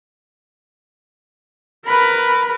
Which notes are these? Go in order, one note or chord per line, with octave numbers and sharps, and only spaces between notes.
A#4 B4 B5